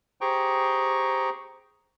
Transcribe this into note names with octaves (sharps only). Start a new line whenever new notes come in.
G4 G#4 C5 G5 A#5 C#6